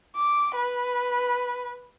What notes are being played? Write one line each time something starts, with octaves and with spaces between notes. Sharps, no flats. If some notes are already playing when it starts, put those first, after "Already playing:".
D6
B4